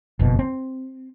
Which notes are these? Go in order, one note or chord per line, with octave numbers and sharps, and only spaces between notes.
F#1 F2 B2
C4